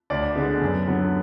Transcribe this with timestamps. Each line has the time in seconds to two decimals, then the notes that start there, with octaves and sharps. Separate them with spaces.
0.10 D2 D5
0.35 D3 G#3 B3 D4
0.62 F#2
0.87 D3 F#3 B3